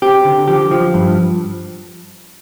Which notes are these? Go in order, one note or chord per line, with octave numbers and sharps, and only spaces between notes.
C4 G4
D3
F3 G4
F3
G2